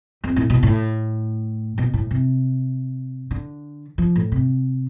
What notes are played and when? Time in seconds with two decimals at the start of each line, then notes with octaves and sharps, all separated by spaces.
0.24 F2
0.36 A2
0.50 B2
0.63 A2
1.78 B2
1.94 A2
2.11 C3
3.31 D3
3.98 F3
4.16 A2
4.32 C3